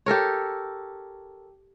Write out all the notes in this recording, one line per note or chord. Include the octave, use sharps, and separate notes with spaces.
G4 A4 A#4 C#5